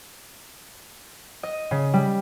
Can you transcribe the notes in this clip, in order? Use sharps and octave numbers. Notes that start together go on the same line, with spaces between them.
D#5
C#3
G3